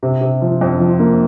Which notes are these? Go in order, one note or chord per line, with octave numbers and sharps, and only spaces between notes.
C3
C3
F3
F2
F3
A#3